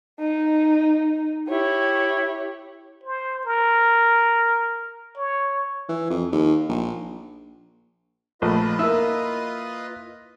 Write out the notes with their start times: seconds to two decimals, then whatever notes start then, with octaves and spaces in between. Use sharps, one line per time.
0.20 D#4
1.48 E4 G4 C#5
3.04 C5
3.45 A#4
5.17 C#5
5.89 E3
6.10 F2
6.32 D#2
6.69 A#1
8.42 A#1 A3 F4 B4 D#5
8.79 A#3 E4 E6